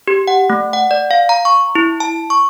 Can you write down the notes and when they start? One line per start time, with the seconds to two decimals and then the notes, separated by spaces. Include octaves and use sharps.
0.08 G4
0.28 F#5
0.50 A3
0.73 F#5
0.91 D5
1.11 F5
1.29 A#5
1.45 C#6
1.75 E4
2.00 A5
2.30 C#6